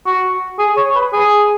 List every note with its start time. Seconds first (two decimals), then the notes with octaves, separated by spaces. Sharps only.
0.06 F#4
0.59 G#4
0.77 C#5
0.95 B4
1.13 G#4